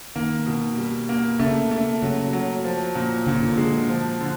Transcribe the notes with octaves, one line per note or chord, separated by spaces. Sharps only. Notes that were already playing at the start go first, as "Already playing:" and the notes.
D#3 A#3
B2
G3
A#3
C#3 A3
A3
C#3 F#3
F#3
F3
A#2
A#2 D3
C#3
D3
G#3
F3
D3